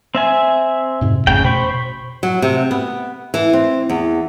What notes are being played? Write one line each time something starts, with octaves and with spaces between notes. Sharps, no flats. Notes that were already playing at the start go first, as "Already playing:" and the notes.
C4 E5 G#5
F2 G#2 C3
A1 F2 C#3 A3 G5
B2 C5 B5 C#6
F#3
C3
B3
E3
C4
E2